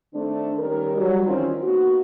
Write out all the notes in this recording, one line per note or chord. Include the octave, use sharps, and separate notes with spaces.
D#3 A3 C4 D4
D#3 G3 C#4 A#4
F#3 G3
D#3 E3 C4 C#4 F4
A#3 B3 D#4 F#4